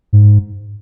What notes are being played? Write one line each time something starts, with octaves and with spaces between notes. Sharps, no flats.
G#2